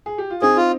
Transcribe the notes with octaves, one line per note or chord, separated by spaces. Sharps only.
G#4
G4
F4
C4 D#4 G#4
F4